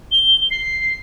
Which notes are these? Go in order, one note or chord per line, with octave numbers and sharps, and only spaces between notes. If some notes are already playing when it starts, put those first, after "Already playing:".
G7
C7